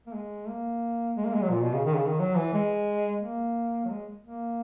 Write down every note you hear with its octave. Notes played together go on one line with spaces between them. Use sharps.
A#3
G#3
A#3
G#3
A#3
G#3
F#3
A#2
B2
C#3
D#3
C#3
D#3
F#3
E3
G#3
A#3
F#3
G#3
A#3